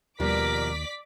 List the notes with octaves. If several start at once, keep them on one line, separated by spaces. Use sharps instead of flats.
D#2 B2 F3 G3 A#4 D5 D6 B6